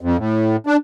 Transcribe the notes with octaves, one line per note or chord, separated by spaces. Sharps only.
F2
A2
D4